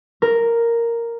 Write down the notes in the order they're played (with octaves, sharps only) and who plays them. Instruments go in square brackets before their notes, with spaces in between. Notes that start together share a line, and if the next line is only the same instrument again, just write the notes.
[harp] A#4